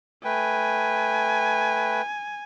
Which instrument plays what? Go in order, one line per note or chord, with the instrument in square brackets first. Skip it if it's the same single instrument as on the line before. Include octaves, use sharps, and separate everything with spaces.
[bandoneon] A3 B4 G5 [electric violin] G#5